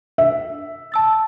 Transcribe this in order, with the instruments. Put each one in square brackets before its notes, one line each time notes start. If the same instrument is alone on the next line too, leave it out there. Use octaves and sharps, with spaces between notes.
[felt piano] E5
[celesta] A5 E6 A6